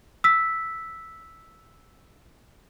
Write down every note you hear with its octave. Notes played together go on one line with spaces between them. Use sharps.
E6 B6